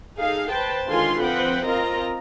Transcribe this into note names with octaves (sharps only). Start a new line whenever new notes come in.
D#4 G#4 A4 F5
B4 C5 G5 A5
D3 D#3 G#3 F4 G#5 C6
F3 C4 B4 F#5 G5
C4 F4 A#4 D#5 A#5